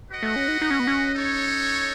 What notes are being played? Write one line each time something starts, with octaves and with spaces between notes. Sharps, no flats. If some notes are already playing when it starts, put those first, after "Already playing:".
F#4 B4 D#5 F#5
A3
C#4
D#4
D#4
C#4
B3
C#4
D#4 A4 C#5